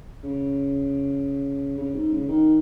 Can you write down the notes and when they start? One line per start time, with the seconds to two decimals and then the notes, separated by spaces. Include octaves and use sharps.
0.23 C#3
1.78 C#3
1.95 G#2
2.12 C#3
2.29 D#3